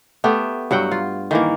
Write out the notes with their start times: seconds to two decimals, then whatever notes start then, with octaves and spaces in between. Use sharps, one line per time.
0.24 A3 B3 G4
0.71 G2 F#3 F#5 G5
0.91 F4
1.31 D#3 E3 A#3